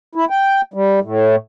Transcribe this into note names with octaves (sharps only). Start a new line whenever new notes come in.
E4
G5
G3
A2